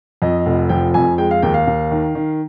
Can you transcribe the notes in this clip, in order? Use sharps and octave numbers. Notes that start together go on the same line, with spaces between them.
F2 D#5
F1
F3 G5
F2 G#5
G#3 G5
F5
D#2 G5
F5
D#2
D#3
D#3